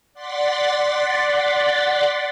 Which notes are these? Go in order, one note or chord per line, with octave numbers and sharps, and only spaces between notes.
D5 F#5 C6 A6 B6